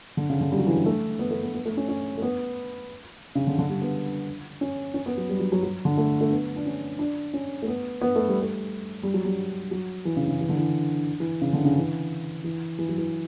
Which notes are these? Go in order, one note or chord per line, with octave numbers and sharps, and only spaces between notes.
D3
C#3
D3
G3
F#3
E3
F#3
A3
B3
A3
B3
B3
A3
C#4
C#4
A3
B3
C#3
D3
D3
G3
B3
C#4
C#4
B3
F#3
G3
F#3
F#3
F#3
D3
A3
A3
B3
D4
C#4
D4
C#4
A3
B3
B3
A3
G3
A3
G3
F#3
G3
F#3
E3
C#3
C#3
E3
D3
E3
E3
C#3
D3
C#3
E3
E3
E3
F#3
E3